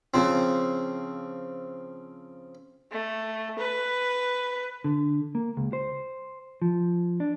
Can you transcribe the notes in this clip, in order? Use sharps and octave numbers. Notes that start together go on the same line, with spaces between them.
C#3 F3 C4
A3
B4
D3
A#3
C#2
C5
F3
D4